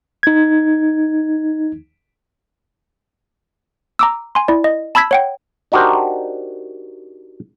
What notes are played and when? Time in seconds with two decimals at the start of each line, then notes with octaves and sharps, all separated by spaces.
0.23 D#4 G#6
3.99 A#5 D6 E6
4.35 G#5 C6
4.48 E4 D5
4.64 D#5
4.95 A5 B5 E6 G#6 B6
5.11 C#5 F#5 G5
5.72 D4 D#4 F#4 G4 A#4 C5